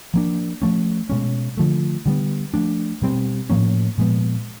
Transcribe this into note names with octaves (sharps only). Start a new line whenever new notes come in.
F3 A#3 D4
F3 A3 C#4
B2 G#3 C#4
D3 F3 A3
D3 G3 B3
F3 A3 D4
B2 G3 C4
A2 F3 A#3 C#4
A#2 F3 G#3 B3